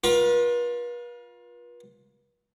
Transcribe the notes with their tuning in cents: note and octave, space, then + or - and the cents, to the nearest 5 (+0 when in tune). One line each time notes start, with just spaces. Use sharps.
F4 +20 B4 -40